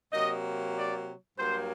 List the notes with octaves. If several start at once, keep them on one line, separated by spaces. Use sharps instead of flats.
C3 F#3 A#3 D#5
D5
G2 F#3 A#3 C5